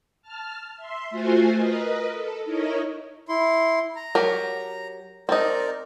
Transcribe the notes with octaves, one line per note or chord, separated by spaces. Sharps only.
A5 F6
E5 C6
A3 F4 F#4 C5 G#5
A#4 B4 D#5
A4
D#4 E4 A#4 C#5 D#5
E4 C6
A#5
F#3 G4 A#4
C4 D#4 A#4 D5